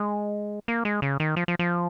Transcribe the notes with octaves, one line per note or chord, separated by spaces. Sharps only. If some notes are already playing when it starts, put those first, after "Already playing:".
Already playing: G#3
A#3
G#3
C#3
D#3
F3
F3
F3